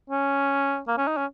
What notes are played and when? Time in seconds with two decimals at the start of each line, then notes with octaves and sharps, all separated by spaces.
0.10 C#4
0.88 A#3
0.98 C#4
1.08 D#4
1.17 C#4